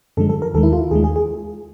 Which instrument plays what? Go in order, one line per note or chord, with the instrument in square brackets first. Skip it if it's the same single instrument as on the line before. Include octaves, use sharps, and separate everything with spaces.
[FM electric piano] F#2 D3 F3 G#3 A4
A4
A#4
D#2 D#3 G#3 A4
E4
F4
D#2 D#3 G#3 G#4
G#4
G#4